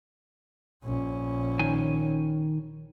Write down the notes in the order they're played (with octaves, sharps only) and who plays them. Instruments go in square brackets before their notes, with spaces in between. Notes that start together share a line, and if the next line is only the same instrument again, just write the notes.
[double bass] A#1 C#4
[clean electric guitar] D#3 G#5